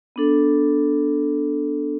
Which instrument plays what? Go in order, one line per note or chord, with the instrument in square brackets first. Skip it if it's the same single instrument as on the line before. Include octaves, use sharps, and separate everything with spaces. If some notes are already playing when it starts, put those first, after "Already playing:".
[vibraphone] B3 D4 A4